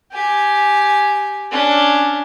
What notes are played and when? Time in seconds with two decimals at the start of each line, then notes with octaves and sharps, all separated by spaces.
0.13 G4 G#5
1.52 C#4 D4